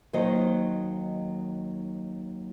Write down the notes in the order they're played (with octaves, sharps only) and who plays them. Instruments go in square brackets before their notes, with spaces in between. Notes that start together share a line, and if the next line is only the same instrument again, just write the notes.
[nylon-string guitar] D#2 D#3 F#3 D#4 C5 D#5